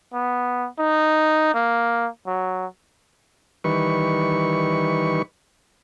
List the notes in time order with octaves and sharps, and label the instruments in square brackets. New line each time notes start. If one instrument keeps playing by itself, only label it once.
[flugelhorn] B3
D#4
A#3
F#3
[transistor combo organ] D#3 E3 G3 B4 C#6